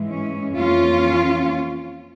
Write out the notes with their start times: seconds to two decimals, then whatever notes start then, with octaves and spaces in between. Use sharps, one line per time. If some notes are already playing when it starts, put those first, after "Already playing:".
Already playing: G#2 E3 G#3
0.08 C#4
0.55 F2 E3 A#3 C#4 F4